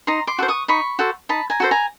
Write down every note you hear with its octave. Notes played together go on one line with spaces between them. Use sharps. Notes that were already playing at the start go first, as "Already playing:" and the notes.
D#4 A#5 C6
C6 D6
F#4 A4 C5
C#6 D#6
D#4 B5 C#6
F#4 A4 C5
D#4 A5 B5
G#5 A#5
F#4 A4 C5
G#5 A#5